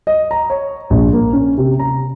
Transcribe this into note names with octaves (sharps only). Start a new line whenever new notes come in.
D#5
A#5
C#5
A#1
A#3
C#4
C3
A#5